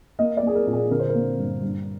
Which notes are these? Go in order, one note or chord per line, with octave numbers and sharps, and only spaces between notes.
A#3 D#5
D5
A#3 G#4
A#4
A#2
G#4
D3 A#4
C5
A#4
A#3
G2
G2